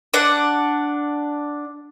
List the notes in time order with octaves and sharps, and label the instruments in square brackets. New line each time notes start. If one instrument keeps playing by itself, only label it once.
[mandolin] D4 F#5